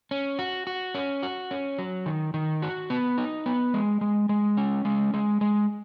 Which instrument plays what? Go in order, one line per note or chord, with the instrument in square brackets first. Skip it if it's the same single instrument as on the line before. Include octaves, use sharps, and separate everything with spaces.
[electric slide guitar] C#4
F#4
F#4
C#4
F#4
C#4
F#3
D#3
D#3
F#4
B3
D#4
B3
G#3
G#3
G#3
C#4
G#3
G#3
G#3